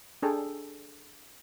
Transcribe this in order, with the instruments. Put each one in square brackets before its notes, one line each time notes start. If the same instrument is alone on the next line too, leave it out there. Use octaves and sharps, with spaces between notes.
[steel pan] D4 G#4 A4 G5